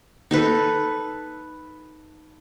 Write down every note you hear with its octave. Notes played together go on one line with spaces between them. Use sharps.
D#4 A4 B4